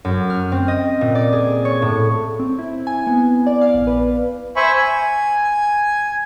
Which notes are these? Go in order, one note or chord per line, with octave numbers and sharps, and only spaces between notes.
F#2
F6
C4
D#5
A#2
D5
G#4
C#5
A2
C4
E4
G#5
B3
D5
F5
A#1
B4
C5 E5 G#5 B5 C#6
G#5